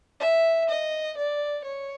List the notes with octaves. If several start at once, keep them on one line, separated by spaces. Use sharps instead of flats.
E5
D#5
D5
C#5